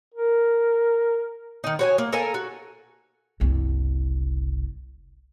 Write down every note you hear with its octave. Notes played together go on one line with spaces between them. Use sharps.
A#4
D#3 D#4
F#4 C#5 G#5
A#3
A4 A#4 F5 G#5
F#4
F#1 C2